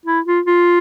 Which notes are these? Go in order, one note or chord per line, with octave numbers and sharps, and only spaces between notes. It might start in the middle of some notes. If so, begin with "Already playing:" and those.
E4
F4
F4